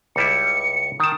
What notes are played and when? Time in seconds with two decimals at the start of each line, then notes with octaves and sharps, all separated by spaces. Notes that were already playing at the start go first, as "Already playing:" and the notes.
0.16 C#2 G3 E4 C#7
1.00 D#3 A5 D#6